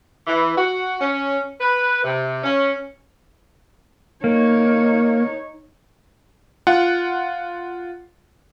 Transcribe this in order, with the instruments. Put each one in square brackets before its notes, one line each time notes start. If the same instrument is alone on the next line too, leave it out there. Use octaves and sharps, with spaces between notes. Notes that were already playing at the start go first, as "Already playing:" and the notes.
[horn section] E3
F#4
C#4
B4
C3
C#4
[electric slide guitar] A#3 [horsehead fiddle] D#4 C#5
[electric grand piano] F4 F#5